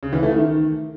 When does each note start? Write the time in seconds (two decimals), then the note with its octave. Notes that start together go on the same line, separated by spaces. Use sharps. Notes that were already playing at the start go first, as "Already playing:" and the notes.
0.03 C#3
0.13 E3
0.23 A3
0.33 D#3